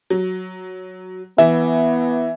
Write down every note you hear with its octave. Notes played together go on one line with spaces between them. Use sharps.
F#3
E3 B3 E5